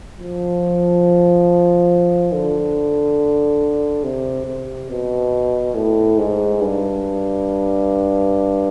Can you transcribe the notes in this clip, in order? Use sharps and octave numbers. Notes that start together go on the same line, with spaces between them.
F3
D3
C3
C3
B2
A2
G#2
G2